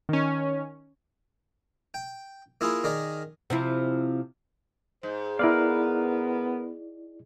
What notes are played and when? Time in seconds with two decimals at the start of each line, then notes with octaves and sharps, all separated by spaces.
0.09 D#3 C#4
1.94 G5
2.61 A#3 E4 F4 G#4
2.84 D#3 G#4 A#4 D5
3.50 C3 F3 E4
5.03 G#2 C5
5.39 B3 E4 A#4 B4 D5 F5